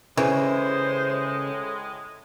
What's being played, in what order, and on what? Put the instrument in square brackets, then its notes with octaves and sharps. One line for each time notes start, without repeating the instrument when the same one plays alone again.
[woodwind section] A2 G#3 [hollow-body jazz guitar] C#3 [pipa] E3 [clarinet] C5